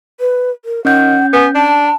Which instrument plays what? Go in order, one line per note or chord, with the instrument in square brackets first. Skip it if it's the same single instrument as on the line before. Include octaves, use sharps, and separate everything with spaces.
[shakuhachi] B4
A#4
[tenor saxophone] D#3 [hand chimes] C#4 G6 [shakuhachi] F#5
[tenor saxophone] B3 [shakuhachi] G#5
[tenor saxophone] D4 [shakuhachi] A5